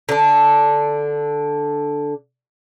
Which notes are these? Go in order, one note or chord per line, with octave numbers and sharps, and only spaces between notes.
D3 D4